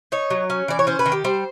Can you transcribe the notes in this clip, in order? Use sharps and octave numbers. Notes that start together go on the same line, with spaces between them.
D#4 C#5
F#3
C#4
E3 D5
C#5
C#4 C5
B4
D#3
G4
G3 C5